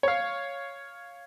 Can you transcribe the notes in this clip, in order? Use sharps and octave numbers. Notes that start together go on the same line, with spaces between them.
C#5 F5